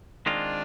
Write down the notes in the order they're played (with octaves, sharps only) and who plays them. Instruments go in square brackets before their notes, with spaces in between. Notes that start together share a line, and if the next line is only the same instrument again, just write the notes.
[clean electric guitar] D#3 G#3 C4 F4 [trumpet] D4